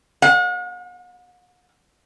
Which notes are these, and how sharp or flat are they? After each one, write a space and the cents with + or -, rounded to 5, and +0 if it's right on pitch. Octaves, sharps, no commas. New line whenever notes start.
F#5 -45